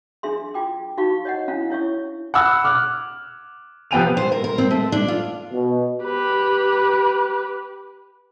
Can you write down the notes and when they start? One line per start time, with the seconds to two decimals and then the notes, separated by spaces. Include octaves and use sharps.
0.23 D4 G#4 E5 C6
0.54 F4 G5 D6
0.97 D#4 F#4 F5 C#6
1.25 C#5 D#5 F#5
1.48 C#4 D4 E4 F5
1.70 E4 C#5 E5 C#6
2.34 F#5 B5 E6 F#6
2.64 D6 F6 F#6
3.91 C3 F3 B3 G5 D#7 F7
4.17 C5
4.32 A#4
4.44 A#4
4.58 C4
4.71 A3
4.92 D4
5.08 F4
5.53 B2
6.04 G4 B4